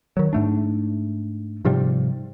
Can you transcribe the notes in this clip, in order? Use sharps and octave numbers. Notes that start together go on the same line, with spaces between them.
D#3 F#3
G#2 A3 D4
G#2 C3 F3 G3